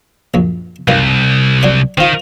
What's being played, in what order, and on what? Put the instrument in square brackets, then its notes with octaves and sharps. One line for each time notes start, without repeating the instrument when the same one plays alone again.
[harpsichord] A#1 F#2
[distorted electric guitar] C2 [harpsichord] F#2 D#3 A#3
[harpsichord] F#3 D4 C#5
[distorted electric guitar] D#3 [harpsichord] C4 F4